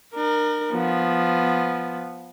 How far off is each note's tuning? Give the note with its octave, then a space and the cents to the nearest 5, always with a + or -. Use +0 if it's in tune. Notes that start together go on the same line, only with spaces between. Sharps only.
D4 +45 A#4 +0
F3 +0 B3 +0